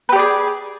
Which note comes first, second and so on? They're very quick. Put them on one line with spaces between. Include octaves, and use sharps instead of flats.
B4 G4 D5 G#4